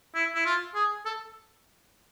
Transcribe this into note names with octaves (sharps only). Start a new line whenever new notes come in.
E4
E4
F4
G#4
A4